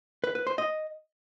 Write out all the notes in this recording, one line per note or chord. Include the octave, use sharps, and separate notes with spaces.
B4
B4
C5
D#5